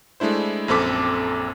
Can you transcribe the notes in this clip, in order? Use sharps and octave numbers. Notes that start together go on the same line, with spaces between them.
G#3 A3 D4 E4 C5
A#1 F#2 C4 A4 D6 B6